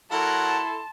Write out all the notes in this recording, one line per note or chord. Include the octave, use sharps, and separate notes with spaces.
F#3 E4 A4 A#4 F#5 A5 C6